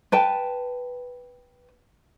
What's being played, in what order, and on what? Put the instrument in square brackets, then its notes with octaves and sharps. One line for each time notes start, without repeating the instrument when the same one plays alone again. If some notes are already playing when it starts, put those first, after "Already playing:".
[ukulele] B4 G5 A5